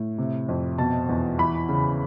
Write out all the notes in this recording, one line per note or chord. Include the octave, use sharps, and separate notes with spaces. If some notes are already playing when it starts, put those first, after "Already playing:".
Already playing: A2
C3
F2
B2 A5
E2
E3 B5
C#3